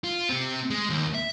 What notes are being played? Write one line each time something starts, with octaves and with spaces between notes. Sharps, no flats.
F4
C4 G4
G#3
D#2
E5